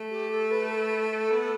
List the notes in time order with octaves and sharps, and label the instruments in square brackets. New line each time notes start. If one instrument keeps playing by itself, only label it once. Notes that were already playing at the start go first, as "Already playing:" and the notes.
Already playing: [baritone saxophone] A3
[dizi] G4
A4
B4
A4
[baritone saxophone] B3